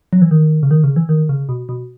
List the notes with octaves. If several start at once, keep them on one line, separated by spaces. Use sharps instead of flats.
F#3
E3
D#3
C#3
D#3
C#3
E3
D#3
C#3
B2
B2